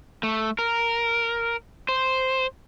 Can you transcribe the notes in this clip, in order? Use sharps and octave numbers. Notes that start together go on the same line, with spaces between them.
A3
A#4
C5